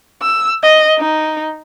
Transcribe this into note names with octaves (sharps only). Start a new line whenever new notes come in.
E6
D#5
D#4